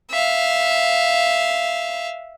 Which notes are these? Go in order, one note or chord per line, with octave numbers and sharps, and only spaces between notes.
E5 F5